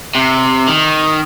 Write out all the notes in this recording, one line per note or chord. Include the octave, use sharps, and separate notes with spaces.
C3
D#3